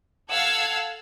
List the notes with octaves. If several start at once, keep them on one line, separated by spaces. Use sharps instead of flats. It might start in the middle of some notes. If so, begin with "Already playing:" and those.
A4 F5 F#5 A5 E6 G#6